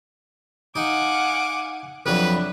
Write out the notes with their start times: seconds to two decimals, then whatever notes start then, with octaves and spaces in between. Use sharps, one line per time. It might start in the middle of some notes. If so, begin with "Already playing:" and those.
0.76 D#4 F5 F#5 G#5 D6
2.06 F2 F#3 D4 E4 B4